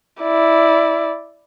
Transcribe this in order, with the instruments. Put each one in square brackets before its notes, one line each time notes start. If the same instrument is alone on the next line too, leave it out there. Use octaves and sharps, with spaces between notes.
[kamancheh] E4 D5